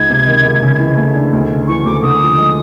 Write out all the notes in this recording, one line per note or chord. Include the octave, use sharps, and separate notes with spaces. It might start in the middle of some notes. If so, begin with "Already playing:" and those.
Already playing: C#2 D#4 G#6
C3
D#3
C#2
C#3
E3
A3
D4
D2
C#3
E3 C#6
D2 D6
D3 D#6
F3
G#3